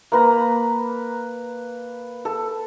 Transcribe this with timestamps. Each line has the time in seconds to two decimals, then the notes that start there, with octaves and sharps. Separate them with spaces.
0.12 A#3 B4 A#5
2.25 A4